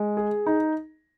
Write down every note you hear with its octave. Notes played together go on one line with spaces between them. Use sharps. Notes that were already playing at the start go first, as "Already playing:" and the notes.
Already playing: G#3
G#4
D#4